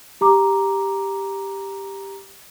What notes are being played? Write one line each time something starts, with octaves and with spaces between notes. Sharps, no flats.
G4 A#5 D6